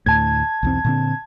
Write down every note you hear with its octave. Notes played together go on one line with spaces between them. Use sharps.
D2 A2 A5 G#6
B1 E2 C4
A#2 D3 C4